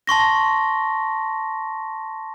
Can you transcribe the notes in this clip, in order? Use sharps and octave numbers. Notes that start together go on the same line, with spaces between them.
A5 C6 C#6 A#6